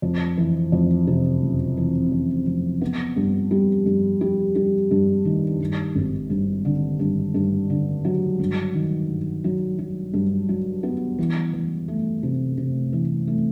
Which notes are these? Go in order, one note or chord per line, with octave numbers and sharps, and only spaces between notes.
F2
E3
F2
C3
F#1
E3
F2
F2
B3
G2
G3
G2
G3
G3
G2
D#3
G2
G#1
G2
D3
G2
G2
D3
F#3
G2
D#3
G2
F#3
F#3
G2
F#3
B3
E3
E3
A3
C3
C3
E3
A3